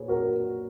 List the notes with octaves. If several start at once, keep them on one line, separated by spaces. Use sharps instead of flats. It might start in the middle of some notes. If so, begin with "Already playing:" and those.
Already playing: A#2 G#4 B4 C#5
F#4 A#4